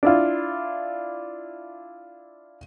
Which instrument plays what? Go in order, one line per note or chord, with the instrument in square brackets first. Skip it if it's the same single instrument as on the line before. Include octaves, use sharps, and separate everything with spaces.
[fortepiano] D4 E4 F4